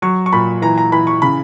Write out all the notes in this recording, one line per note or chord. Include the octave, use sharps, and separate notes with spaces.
F#3 C#6
C#6
A#2 B5
E3 A#5
A#5
E3 B5
C#6
C#3 B5